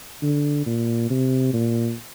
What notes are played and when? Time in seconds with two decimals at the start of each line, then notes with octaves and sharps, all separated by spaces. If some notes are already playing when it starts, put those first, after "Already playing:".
0.22 D3
0.66 A#2
1.10 C3
1.54 A#2